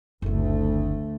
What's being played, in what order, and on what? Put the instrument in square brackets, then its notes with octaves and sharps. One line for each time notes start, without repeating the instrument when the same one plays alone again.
[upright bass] F#1 C4 [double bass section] D2 A3